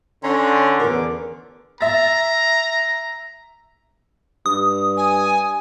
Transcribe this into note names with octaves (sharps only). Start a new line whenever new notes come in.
D3 C#4 C#5 A#5 C6
E2 A#4 D6
E5 A#5 A6
G2 D#6
G#5